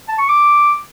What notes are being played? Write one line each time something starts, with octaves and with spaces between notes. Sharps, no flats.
A5
C#6
D6